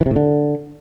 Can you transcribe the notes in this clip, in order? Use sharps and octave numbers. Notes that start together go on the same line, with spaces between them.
E3
C3
A2
D3